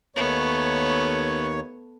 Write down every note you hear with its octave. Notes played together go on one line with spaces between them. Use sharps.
D#2 A3 B3 C#5